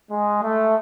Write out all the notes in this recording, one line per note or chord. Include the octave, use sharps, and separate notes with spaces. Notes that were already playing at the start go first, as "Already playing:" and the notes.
G#3
A3